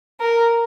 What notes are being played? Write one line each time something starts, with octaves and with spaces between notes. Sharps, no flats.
A#4